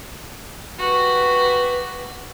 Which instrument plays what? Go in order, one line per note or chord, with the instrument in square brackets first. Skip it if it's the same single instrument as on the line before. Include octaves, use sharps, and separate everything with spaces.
[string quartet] F#4 G4 [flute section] B4